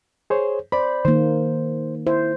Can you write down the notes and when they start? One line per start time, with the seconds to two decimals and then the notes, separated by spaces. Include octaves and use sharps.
0.30 G#4 C5 C#5
0.72 C5 D5 B5
1.05 D#3 A#3 C5
2.07 E4 C5